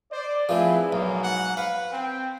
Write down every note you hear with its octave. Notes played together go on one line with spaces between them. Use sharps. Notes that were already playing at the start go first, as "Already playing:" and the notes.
C5 D5
F3 A3 C4 E4 G#4 B4
B1 G#2 F#3 A#3
F#5
B4 F5
C4 G5